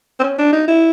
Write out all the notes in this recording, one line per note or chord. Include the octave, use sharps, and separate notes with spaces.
C4
C#4
D4
D#4
E4